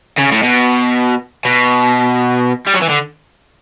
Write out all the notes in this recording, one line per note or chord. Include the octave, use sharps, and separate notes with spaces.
C#3
A2
B2
B2
G3
F#3
E3
D3